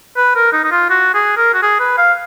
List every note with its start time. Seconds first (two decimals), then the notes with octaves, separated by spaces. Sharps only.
0.17 B4
0.36 A#4
0.53 D#4
0.64 D#4
0.72 F4
0.90 F#4
1.14 G#4
1.37 A#4
1.54 F#4
1.63 G#4
1.80 B4
1.98 F5